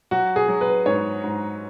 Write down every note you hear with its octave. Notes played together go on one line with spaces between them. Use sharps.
F#3 F#4
G#4
F#3
B4
G#2 C#5
G#2